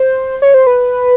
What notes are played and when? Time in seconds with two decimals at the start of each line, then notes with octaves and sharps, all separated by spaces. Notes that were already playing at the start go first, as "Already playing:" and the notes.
Already playing: C5
0.42 C#5
0.54 C5
0.67 B4